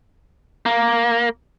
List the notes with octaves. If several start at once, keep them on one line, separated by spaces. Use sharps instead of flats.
A#3